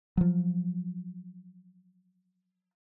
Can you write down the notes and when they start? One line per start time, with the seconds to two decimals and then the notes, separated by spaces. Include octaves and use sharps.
0.17 F3 F#3